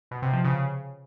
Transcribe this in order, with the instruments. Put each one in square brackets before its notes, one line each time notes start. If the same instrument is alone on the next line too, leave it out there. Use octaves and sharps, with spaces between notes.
[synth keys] B2
C3
F3
C#3